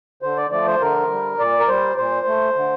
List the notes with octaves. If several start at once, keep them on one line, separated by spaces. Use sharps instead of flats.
D3 C5
D5
F3 A3 D5
C5
D3 A#4
G3
A#2 D5
A#4
G3 C5
A#2 C5
A3
D3